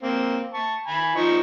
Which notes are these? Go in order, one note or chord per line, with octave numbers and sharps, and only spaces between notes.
A#3 C4
A5 C#6
G#5 B5
F3 D#4 C#6